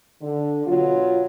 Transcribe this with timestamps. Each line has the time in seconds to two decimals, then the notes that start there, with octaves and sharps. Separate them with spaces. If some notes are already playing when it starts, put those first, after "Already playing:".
0.22 D3
0.67 B2 F#3 F4